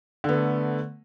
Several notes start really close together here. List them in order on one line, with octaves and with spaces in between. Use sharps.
D3 B3 A3